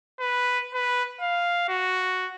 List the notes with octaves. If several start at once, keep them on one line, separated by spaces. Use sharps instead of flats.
B4
B4
F5
F#4